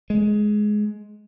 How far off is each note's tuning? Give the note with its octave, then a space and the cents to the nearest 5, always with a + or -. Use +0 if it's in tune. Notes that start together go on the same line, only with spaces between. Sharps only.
G#3 +15